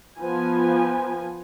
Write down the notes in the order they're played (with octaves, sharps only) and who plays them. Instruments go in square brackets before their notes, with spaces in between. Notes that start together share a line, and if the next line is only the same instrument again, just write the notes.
[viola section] F3 B3 G#5